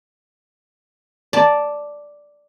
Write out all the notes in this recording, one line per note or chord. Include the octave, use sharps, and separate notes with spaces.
D5 A5